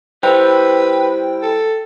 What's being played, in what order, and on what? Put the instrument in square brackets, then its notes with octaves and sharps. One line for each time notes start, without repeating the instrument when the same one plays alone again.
[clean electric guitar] G3 E4 [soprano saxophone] B4 [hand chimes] C5 [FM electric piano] G5
[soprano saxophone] A4